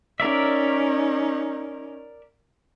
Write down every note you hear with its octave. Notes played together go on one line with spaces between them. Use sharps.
C#4 D#4 A#4 D5 E5